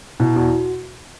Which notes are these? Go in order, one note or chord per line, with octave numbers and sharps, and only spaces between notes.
B2 E4
E2 F#4